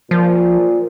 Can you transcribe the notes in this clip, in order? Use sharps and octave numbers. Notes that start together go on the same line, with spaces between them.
A#2 F3